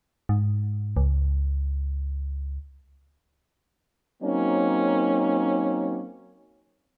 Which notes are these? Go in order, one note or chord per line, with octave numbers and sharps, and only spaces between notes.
G#2
C#2
F#3 A#3 C4 C#4 D#4